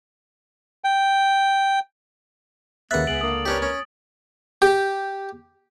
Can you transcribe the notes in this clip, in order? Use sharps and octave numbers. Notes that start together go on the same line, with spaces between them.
G5
D#2 C#3 A#3 B4 E5 F#5 F#6 A6
C#2 B3 G#4 D7 F#7
D3 A#3 D#6
C#4 D4 G4 A#4 B4 C#5
C#4
G4